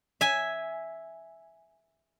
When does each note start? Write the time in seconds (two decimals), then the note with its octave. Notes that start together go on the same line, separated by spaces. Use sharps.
0.21 E5 G#5